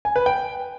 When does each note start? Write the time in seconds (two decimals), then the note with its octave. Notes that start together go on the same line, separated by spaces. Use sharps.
0.05 G#5
0.16 B4
0.26 G5